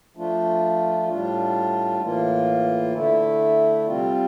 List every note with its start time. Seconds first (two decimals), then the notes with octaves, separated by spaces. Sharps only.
0.16 F3 A3 D4 F4
1.09 A2 G3 D4 F4
2.01 A2 E3 A#3 F4
2.94 D3 A3 E4
3.86 C3 G3 C4 F4